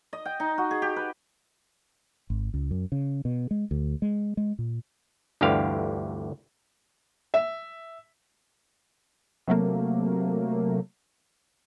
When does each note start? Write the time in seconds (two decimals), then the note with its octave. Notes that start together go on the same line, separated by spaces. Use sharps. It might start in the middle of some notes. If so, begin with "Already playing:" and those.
0.13 D#5
0.25 G5
0.40 D#4
0.58 F#4
0.71 G#4
0.82 G4
0.96 B4
2.30 G#1
2.54 C#2
2.71 F#2
2.92 C#3
3.25 B2
3.51 G#3
3.71 D2
4.02 G#3
4.37 G#3
4.59 A#2
5.41 G1 D2 D3 E3 G4 F5
7.34 E5
9.47 C3 F#3 A3 A#3